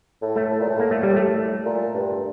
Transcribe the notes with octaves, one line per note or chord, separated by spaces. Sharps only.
A2
A3
A2
A#2
A2
A#3
A3
G3
A3
A#2
G2